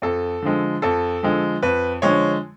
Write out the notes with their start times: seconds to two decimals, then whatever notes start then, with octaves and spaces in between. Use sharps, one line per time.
0.02 F2 A4
0.42 D3 F3 G#3
0.82 F2 A4
1.23 D3 F3 G#3
1.62 F2 B4
2.02 D3 F3 G#3 C#5